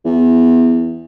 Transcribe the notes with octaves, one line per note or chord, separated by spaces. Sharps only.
E2